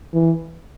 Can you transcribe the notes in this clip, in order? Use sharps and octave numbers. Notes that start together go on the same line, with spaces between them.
E3